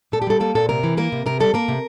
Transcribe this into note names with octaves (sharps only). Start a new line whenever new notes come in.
A#2 A4
G4
G3 A4
A#3 A4
A#2 A4
C3 A#4
E3
A#3 A#4
C3
C3 A#4
G3 A4
A#3 A#4
C3